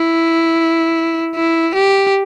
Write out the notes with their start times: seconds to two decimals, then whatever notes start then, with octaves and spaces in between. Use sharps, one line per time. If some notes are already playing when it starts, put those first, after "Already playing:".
Already playing: E4
1.35 E4
1.75 G4